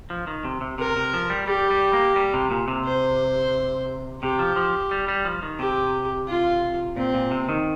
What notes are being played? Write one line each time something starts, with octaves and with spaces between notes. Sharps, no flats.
F3
D#3
C3
C3
C3 A#4
C3
F3
G3
G3 G4
G3
A#3
G3
C3
A#2
C3
C5
C3 G4
F3
F3
G3
G3
F3
D#3
C3 G4
F4
A#2 C4
A#2
C3
D#3